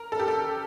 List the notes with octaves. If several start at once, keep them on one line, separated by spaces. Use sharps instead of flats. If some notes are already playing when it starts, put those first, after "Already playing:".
Already playing: A#4
A4
G4
A4